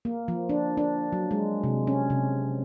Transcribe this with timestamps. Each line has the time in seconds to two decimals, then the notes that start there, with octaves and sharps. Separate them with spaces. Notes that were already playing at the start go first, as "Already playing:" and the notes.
0.05 A#3
0.28 F3
0.49 D4
0.77 D4
1.13 F#3
1.31 G#3
1.64 C3
1.87 C#4
2.10 C3